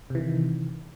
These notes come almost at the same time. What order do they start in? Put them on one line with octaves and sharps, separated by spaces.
C3 E3 D#3